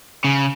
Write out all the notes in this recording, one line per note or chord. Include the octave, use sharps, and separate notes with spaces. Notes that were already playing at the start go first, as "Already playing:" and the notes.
C#3